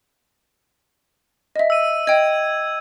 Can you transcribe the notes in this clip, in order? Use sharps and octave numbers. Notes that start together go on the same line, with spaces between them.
D#5 E5
E6 D#7
D#5 G5 G#6